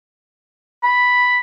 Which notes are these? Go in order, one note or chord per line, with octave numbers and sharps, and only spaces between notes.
B5